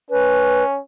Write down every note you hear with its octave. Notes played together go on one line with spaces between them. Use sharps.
C#4 B4